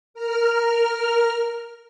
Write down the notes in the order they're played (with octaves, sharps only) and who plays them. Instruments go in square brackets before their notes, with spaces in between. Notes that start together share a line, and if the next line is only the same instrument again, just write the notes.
[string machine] A#4 F6